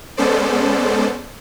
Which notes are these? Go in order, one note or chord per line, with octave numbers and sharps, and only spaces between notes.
G#3 B3 C#4 A4 C5 D5